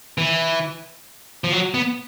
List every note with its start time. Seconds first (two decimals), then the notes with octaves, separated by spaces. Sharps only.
0.18 E3
1.44 F3
1.52 F#3
1.74 B3